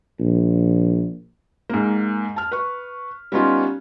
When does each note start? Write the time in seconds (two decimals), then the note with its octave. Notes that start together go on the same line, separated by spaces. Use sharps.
0.19 A#1
1.70 G#2 A#3
2.36 A5 F6
2.52 B4 C#6
3.32 G3 B3 C#4 D#4 F4